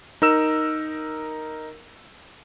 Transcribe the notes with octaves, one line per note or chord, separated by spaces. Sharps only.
D#4 A#4 E6 E7